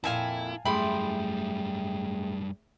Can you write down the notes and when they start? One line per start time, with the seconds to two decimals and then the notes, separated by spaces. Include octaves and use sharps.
0.04 F2 A#2 E4 F5 G#5 A5
0.65 F#2 G3 A3 E4 G#4 G5 B5 C6